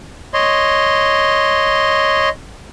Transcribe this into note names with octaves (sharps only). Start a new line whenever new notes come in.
C#5 D#5 C6